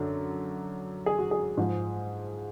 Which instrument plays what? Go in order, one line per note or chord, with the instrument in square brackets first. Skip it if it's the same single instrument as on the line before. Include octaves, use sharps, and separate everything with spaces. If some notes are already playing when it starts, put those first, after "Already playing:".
Already playing: [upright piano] F#2 D3 F#3
G#4
F#4
G#4
G#2 F3